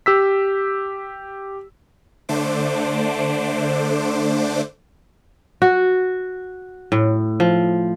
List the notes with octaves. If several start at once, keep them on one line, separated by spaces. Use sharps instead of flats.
G4 E6 B6
D3 A3 D4 C5 D6
F#4
A2
F3